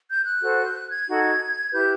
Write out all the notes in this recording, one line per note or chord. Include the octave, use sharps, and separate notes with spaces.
G6
F#6
F#4 A4 C5
G6
F#6
G#6
D#4 F#4 A4
E4 G4 B4 G6